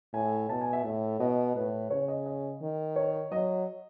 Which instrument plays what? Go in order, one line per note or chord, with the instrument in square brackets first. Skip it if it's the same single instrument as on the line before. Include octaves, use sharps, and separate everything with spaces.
[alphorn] A2 [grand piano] G#5
[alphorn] B2 [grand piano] A5
[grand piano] G#5
E5
[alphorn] A2 [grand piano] E5
[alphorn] B2 [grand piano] D#5
[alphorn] A2 [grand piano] B4
[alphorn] C#3 [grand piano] C#5
[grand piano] D#5
D#5
[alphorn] D#3
[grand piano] C#5
[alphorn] F#3 [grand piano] D#5